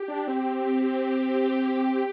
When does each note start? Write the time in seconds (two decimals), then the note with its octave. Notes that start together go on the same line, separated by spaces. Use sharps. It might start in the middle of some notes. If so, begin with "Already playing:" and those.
Already playing: G4
0.08 D4
0.28 C4
1.24 G4